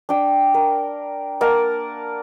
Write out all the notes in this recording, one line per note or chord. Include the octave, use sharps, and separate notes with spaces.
D4 G5
A#4
A#3 A#4 F#5 A5